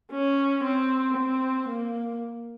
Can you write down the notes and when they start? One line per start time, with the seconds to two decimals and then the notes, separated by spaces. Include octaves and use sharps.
0.12 C#4
0.64 C4
1.17 C4
1.69 A#3